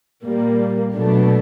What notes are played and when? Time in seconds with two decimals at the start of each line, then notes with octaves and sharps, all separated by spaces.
0.24 A#2 G3 A#3
0.96 B2 F#3 A3 D4